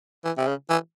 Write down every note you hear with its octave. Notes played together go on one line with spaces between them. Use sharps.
E3
C3
C#3
E3